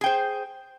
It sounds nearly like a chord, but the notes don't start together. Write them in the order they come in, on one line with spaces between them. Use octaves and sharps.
G#4 G5 C5